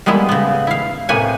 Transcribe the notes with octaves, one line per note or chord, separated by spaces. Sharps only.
G3 G#3 A#3 B3 E4
C#3 B3
E4 F5
A2 C3 A#3 B4 C#5 G#5